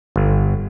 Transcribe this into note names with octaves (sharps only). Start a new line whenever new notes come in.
G1